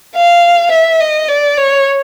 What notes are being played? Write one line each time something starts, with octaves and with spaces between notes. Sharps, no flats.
F5
E5
D#5
D5
C#5